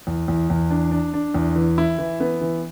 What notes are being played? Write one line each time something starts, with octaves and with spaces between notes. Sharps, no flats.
E2
E2
E2
D4
D4
D4
E2
E3
E4
E3
B3
E3